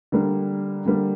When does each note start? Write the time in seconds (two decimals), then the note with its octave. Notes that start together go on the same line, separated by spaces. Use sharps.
0.12 D3 G3 A#3
0.86 D3 G3 A#3